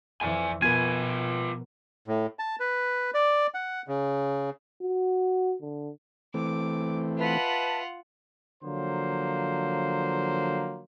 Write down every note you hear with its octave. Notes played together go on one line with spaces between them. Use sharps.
F2 E3 D5 G#5
B2 F3 B3 F4 A#4 B4 G#5
A2
A5
B4
D5
F#5
C#3
F#4
D3
E3 A3 C4 D6
F4 B4 E5 F#5 A5
D3 F3 F#3 A#3 C5